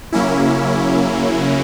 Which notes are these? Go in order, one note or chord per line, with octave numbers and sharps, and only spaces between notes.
C#3 F#3 A#3 C#4 E4